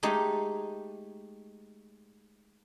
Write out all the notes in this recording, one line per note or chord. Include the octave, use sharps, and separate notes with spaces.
G#3 A3 D#4 G4